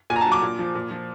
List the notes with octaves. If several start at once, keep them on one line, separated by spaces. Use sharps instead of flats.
A#2 G#5
A#5
A5
F#3
D6
A#2
F3
A#2
F3